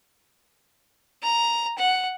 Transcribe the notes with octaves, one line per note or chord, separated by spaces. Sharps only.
A#5
F#5